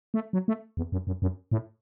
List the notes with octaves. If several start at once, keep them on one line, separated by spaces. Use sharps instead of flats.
A3
F#3
A3
E2
F#2
F#2
F#2
A2